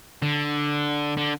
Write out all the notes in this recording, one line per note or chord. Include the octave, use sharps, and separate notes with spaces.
D3
D3